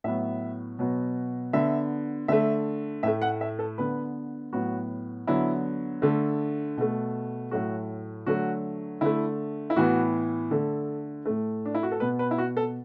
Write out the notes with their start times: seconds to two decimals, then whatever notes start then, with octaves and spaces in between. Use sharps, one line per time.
0.04 A2 F#3 B3 E5
0.79 B2 F#3 B3
1.53 D3 B3 E5
2.28 D3 A3 E5
3.03 A2 A3 E5
3.22 F#5
3.41 E5
3.59 A4
3.78 D3 B3 B4
4.53 A2 F#3 B3 F#4
5.27 D3 F#3 B3 E4
6.02 D3 A3
6.77 B2 A3
7.51 A2 F#3 A3 F#4
8.26 D3 F#3 A3 F#4
9.01 D3 A3 E4
9.70 E4
9.76 A2 E3 B3 F#4
10.51 D3 A3 A4
11.26 A2 A3
11.65 D4
11.75 E4
11.83 F#4
11.92 A4
12.00 B2 B3 B4
12.19 B4
12.31 E4
12.38 F#4
12.57 A4